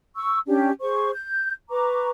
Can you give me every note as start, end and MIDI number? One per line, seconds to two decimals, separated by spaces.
0.15 0.39 85
0.15 0.39 88
0.46 0.70 61
0.46 0.70 62
0.46 0.70 67
0.80 1.10 68
0.80 1.10 72
0.80 1.10 85
1.12 1.52 91
1.70 2.10 71
1.70 2.10 82
1.70 2.10 85
1.70 2.10 86